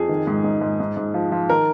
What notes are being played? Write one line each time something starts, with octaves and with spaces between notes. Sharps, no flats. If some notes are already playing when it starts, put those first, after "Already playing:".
Already playing: F2 G#4
D#3
G#2
G#2
G#2
G#2
G#2
F3
F3
D#3 A#4